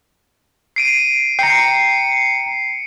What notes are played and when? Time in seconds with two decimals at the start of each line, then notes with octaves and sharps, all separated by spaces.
0.76 C7 D7 D#7
1.39 G5 A#5 C7 C#7